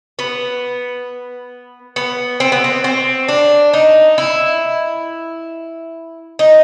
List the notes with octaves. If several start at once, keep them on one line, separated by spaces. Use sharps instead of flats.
B3
B3
C4
B3
C4
C4
D4
D#4
E4
D#4